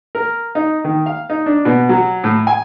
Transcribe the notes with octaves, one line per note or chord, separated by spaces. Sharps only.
A#4
D#4
D#3
F5
D#4
D4
B2
F#3
A2
G#5